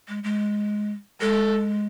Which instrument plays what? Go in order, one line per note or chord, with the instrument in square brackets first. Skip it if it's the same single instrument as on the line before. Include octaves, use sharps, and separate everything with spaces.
[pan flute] G#3
G#3
[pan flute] G#3 [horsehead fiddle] A4